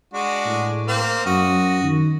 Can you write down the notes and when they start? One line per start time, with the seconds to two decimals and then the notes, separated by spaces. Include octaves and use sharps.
0.14 G#3 D4 F#4
0.45 A2
0.88 A#3 C4 F5
1.26 F#2 F#4 D#5
1.83 D#3